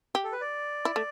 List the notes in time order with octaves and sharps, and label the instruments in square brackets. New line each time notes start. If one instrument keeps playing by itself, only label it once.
[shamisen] G4
[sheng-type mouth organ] A4
B4
D5
[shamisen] E4
A3